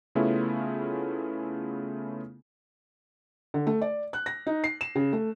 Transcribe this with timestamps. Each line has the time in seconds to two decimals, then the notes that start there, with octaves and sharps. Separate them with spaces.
0.15 C#3 A3 B3 C#4 E4 F4
3.54 D3
3.67 A3
3.81 D5
4.13 F#6
4.26 A#6
4.47 D#4
4.64 C7
4.81 E7
4.95 C#3
5.13 A3